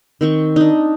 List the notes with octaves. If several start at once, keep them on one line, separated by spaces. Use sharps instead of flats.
D#3 C4 C#6
D4 D#4